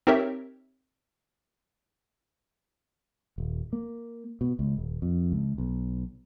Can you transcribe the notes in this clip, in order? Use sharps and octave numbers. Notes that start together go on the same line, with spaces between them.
C4 D#4 G4 A#4 C#5 E5
D#1
A#3
B2
C#2
D#1
F2
C#2
B1